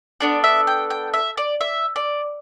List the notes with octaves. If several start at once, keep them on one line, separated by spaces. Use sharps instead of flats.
B3 D4 A4 D5
E5
G5
G5
E5
D5
E5
D5